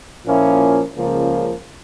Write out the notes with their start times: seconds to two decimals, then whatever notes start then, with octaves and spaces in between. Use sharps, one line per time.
0.25 A#2 F3 A#3 C#4 E4
0.96 C#2 C#3 F3 A#3